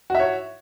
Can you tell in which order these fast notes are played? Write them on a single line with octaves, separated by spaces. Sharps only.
F#4 E5 C#5